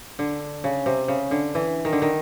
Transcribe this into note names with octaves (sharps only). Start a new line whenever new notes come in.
D3
C#3
C3
C#3
D3
E3
D#3
D3
D#3